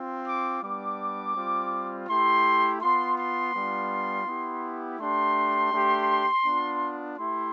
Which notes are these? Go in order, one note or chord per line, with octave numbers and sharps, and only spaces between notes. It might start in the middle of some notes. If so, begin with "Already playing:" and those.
Already playing: C4 F4
D6
G3 B3 D4 D6
G3 C4 F4
A3 E4 G4 C6
B3 F4 C6
C6
G3 B3 D4 F4
B3 E4 G4
A3 D4 G4 C6
A3 D4 G4
B3 D4 F4
A3 E4 G4 C6